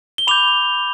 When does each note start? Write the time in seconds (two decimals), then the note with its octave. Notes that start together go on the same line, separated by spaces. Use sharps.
0.18 G7
0.27 B5 D6 G6 F7